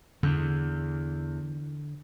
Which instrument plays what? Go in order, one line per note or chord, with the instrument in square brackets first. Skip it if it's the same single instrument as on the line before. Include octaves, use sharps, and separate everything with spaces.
[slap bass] E2 [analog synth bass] D3